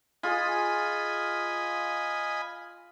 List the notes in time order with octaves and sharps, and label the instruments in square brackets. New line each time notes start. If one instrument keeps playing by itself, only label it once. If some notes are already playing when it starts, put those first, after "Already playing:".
[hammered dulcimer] F4 G#4 [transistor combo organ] D#5 G#5 B5